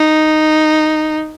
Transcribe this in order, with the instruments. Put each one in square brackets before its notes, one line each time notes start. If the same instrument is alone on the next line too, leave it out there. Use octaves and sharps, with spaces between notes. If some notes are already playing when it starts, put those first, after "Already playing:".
Already playing: [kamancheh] D#4